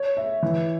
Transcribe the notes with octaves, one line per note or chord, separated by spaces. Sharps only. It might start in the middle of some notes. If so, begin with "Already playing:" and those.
Already playing: C#5
E5
E3